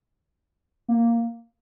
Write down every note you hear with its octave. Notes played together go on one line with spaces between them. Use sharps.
A#3